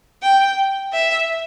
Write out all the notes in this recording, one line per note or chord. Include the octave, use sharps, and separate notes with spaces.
G5
E5